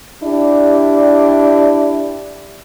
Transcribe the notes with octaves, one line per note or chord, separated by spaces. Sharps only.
D4 E4 G4 D5